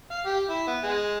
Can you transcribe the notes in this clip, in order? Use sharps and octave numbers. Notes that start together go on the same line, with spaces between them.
F5
G4
E4
B3
G#3